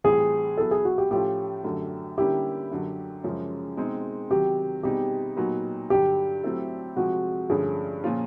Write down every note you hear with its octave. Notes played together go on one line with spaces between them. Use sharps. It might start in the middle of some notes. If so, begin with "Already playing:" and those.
A2 E3 G3 C4 F4 G#4
F#3 B3 E4 A4
G#4
F#4
G4
A2 F3 A3 C#4 F4 G4
F#2 D3 F#3 A3
D3 G3 A#3 C#4 E4 G4
F#2 D3 F#3
F#2 C#3 F3 G#3 C#4
B2 G#3 C4 D#4
C3 D#3 F#3 G4
B2 G3 C4 D#4 G4 G#4
A#2 F#3 B3 D#4 F#4
G2 D3 F#3 G4
F#3 A3 C4 E4 A4
C3 F3 G#3 F#4
G2 D3 F3 A3 C#4 G#4
A#2 F3 A#3 C#4 F4